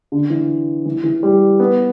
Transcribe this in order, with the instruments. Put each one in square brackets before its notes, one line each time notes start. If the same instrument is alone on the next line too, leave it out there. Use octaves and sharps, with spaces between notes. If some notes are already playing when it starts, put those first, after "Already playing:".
[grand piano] D3
E3
E3
E3
G3
B3